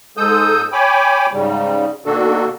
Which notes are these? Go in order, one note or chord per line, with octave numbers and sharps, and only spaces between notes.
G#2 G#3 A4 D#6 E6 G6
C#5 G5 G#5 B5 D6
G#2 C#3 G3
B2 D#3 A#3 D4 F#4 A4